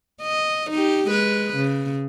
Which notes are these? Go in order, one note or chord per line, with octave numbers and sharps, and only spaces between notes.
D#5
D#4 G4
G#3 B4
C#3